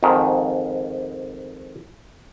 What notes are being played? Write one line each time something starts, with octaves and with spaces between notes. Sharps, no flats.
F2 G#2 D#3